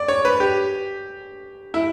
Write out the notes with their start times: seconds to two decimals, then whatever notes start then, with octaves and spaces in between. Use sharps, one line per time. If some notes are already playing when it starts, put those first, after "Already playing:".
Already playing: D5
0.08 C#5
0.25 B4
0.40 G4
1.74 E4